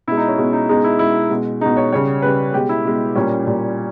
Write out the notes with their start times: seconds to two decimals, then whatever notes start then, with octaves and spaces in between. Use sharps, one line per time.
0.07 B2 G#3 E4
0.17 D#4
0.28 C#4
0.37 B2 G#3
0.53 D#4
0.69 B2 G#3 D#4
0.84 E4
0.99 B2 G#3 E4
1.31 B2 G#3
1.61 B2 G#3 D#4
1.77 C#5
1.92 C#3 G3 C#5
2.22 C#3 G3 B4
2.54 B2 G#3 G4
2.69 E4
2.84 B2 G#3
3.15 A#2 G3 C#4
3.47 A#2 G3